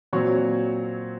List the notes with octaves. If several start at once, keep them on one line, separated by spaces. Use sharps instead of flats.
A#2 F#3 C4 F#4 C#5